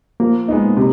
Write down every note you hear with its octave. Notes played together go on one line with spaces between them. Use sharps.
F3 A#3
G#3 B3 D#4
C3